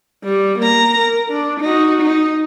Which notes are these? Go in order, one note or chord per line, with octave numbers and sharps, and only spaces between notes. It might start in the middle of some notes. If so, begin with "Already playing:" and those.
G3
A#3 A#5
A#4
D4
D#4 F#4
D#4